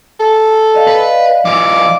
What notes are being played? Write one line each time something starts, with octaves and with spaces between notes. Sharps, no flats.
A4
D5 D#5 F5
B4
F3 E4 D6